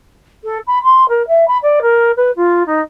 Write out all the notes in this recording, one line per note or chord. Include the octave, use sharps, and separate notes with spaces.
A4
B5
C6
A#4
E5
B5
D5
A#4
B4
F4
D#4